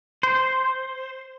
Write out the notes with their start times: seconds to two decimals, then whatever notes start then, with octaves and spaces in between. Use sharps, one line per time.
0.23 C5